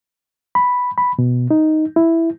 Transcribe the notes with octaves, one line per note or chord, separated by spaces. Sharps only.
B5
B5
B2
D#4
E4